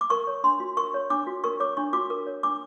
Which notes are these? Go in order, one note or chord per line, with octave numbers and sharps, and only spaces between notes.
D6
A#4 C#6
C#5
D4 C6
F#4
A#4 C#6
C#5
D4 D6
F#4
A#4 C#6
C#5 D6
D4 C#6
F#4 D6
A#4 D6
C#5
D4 D6